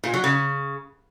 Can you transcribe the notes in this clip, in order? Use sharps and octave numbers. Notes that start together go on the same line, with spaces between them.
A#2
F#3
C#3